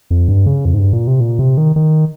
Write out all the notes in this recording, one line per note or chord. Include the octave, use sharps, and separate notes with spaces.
F2
G2
C#3
F2
G#2
G2
A#2
C3
A#2
C3
D#3
D#3